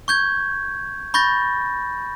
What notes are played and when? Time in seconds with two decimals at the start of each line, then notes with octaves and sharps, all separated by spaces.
0.08 C#6 G6 G#6
1.14 B5 C#6 G6 A6 A#6